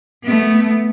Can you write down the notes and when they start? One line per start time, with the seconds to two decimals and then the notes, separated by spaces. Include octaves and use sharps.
0.23 A3 B3